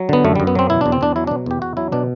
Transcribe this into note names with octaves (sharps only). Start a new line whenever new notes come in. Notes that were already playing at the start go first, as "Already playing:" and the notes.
Already playing: F#3
D3 B3
F#2 A3
G3
F#2
B3
F#3 C4
B2 E4
E2 D4
C4
E2 D4
F#3 E4
D4
B2
E2 G4
E2 F#4
F#3 E4
B2 D4